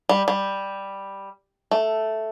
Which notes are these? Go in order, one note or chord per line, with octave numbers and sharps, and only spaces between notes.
G3
G3
A3